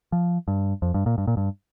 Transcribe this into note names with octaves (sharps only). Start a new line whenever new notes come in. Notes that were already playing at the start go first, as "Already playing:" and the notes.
F3
G2
F2
G2
A#2
G2
A#2
G2